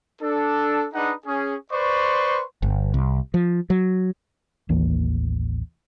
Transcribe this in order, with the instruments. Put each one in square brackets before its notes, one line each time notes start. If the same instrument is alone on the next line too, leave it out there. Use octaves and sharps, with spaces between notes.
[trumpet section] D4 A4
D4 D#4 G#4 B4 D#5 F#5
C#4 G#4
B4 C5 D5 C6 C#6
[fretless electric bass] G1
C2
F3
F#3
[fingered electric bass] A1 D#2 E3 A#3